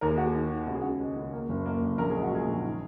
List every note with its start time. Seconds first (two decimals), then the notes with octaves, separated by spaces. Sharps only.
0.01 D#2 A#4
0.10 G#4
0.17 A#3 F#4
0.26 G#4
0.35 D#3
0.51 D#3
0.67 C#2 F#4
0.74 G#4
0.82 C#3 F#4
1.00 G#3
1.16 C#2
1.33 A#3
1.49 F#1
1.66 A#3
1.82 F#1
1.98 A#1 A#4
2.10 G#4
2.15 G#3
2.23 F#4
2.31 A#2 G#4
2.47 A#1
2.64 D#3